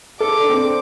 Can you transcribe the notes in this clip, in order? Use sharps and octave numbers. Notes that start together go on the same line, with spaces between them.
A4 D6
D4
C4